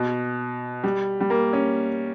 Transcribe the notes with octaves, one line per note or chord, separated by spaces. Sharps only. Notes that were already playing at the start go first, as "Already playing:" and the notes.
Already playing: B2
G3
G3
A#3
C#4